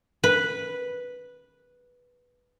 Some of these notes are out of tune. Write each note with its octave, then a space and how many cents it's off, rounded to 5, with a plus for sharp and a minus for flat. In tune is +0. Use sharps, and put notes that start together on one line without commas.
B4 -5